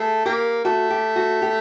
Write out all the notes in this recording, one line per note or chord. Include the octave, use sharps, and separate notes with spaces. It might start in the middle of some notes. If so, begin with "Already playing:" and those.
Already playing: A3 G#4
A#3 G4
A3 F#4
G4
F#4
G4